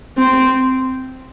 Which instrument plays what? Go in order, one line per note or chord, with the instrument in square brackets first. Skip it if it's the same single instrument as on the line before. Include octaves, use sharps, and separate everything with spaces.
[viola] C4